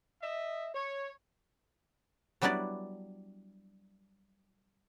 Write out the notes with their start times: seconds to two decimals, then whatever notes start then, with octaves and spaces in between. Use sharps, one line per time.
0.21 D#5 E5
0.75 C#5
2.42 F#3 G3 B3 D4 E4 D5